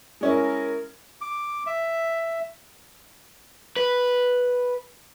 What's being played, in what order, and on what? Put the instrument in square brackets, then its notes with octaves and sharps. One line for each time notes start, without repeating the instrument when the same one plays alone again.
[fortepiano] G#3 C#4 E4 [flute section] A#4
[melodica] D6
E5
[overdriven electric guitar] B4